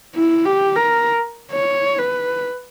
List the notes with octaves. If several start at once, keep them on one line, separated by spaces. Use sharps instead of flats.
E4
G4
A#4
C#5
B4